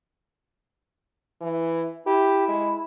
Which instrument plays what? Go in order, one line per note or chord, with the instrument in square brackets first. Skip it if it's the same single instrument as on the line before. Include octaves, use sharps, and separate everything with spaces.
[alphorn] E3
[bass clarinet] E4 [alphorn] G4
[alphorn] G#3